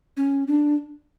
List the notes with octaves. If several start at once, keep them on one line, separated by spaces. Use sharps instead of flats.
C#4
D4